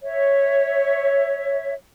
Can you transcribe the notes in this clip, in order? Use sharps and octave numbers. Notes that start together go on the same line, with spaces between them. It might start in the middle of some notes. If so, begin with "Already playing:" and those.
C#5 E5